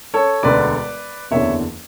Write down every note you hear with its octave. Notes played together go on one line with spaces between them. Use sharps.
A4 C#5
E1 D2 D3 B4 D5
F#1 E2 D3 C#5 E5